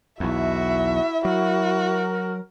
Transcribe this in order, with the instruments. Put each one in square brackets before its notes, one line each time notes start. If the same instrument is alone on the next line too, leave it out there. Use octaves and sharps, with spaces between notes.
[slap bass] B1 E2 [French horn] E4 [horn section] F#4 [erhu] E5
[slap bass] F#3 [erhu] F#4 [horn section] A#4